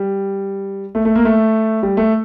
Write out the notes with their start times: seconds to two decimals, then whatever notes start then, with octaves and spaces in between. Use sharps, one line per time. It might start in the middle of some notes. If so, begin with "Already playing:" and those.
Already playing: G3
0.95 A3
1.05 A3
1.15 A#3
1.25 A3
1.83 G3
1.97 A3